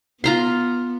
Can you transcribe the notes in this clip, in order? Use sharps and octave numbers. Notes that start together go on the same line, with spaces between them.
B3 F4 A#5 C6